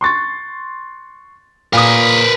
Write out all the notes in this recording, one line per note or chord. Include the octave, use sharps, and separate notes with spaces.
C6 C#6 A6
A#2 A#4 B4 D#6